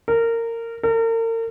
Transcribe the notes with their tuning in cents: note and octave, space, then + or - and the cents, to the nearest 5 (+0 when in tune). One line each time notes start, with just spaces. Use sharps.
A#4 -20
A#4 -40